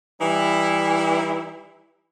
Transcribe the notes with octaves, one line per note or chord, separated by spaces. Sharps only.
E3 G3 D#4 E4